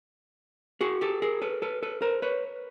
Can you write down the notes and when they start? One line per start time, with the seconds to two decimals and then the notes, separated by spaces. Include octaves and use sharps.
0.81 F#4 G#4
1.01 G4 A4
1.22 G#4 A#4
1.42 A4 B4
1.62 A4 B4
1.83 A4 B4
2.02 A#4 C5
2.22 B4 C#5